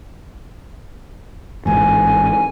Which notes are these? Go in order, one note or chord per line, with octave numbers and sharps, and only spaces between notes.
A1 G#2 E3 G#5